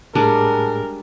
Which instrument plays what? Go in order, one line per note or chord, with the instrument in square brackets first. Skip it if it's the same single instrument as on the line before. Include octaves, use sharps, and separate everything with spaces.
[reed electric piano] A2 G#4 [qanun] G3 G#3 D4 [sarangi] A#4 [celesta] A5